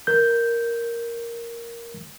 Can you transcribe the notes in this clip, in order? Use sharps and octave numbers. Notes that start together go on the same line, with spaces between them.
A#4 G6